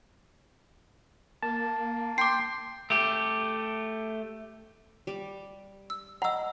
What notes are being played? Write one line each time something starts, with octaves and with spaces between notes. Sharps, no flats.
A#3 A5
G5 C6 D6 C7
A3 G4
G3 D6
E6
D#5 F#5 A#5 E6